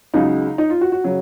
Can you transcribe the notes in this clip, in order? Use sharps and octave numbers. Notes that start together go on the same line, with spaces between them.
C#2 C#3 F#3 D#4
D#4
F4
F#4
F#4
C#3 F#3